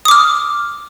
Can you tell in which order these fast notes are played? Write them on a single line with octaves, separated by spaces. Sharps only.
D#6 D6 F6